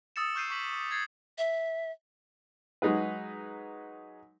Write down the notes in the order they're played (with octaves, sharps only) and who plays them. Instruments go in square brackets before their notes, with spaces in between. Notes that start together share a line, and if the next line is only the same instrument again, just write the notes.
[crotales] D#6 E6 A6 C#7 E7
C#6 F6 G6 C7 D#7
C#6 D6 B6 F#7
D6 E6
G#6 A6 C7
[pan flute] E5
[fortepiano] F#3 G#3 D#4 G#4 B4